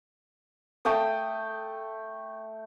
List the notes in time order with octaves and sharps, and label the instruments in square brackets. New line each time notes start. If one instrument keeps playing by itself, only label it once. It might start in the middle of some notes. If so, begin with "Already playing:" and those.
[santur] A3 G5 A5 D#6